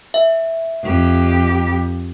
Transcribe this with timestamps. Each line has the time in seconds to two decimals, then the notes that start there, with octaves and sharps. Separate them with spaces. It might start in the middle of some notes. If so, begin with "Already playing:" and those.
0.14 E5
0.83 F2 G4